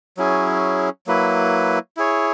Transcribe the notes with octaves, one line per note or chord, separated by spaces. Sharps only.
F#3 C#4 E4 G#4
F#3 A#3 E4 B4
E4 G#4 C#5